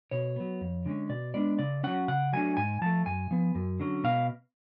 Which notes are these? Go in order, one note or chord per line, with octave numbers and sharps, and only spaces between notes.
B2 C#5
F#3 B3
F2
D3 G#3 C#4
B2 D5
G#3 B3 D4 D5
C#3 D5
F#3 C#4 F#5
C#3 F#5
F#3 A3 D4 G#5
G#2 G#5
F3 A3 A5
F#2 G#5
F3 B3
F#2
D3 F#3 C#4
B2 F5